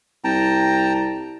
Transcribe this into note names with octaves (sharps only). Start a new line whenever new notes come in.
C2 G5 A5 A#5